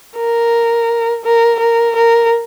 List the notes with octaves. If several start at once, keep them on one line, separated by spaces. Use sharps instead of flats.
A#4
A#4
A#4
A#4